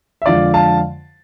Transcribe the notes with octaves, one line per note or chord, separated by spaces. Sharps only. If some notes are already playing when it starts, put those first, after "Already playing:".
E5
F2 D3 F3 G#3 D5 F5
F5 A5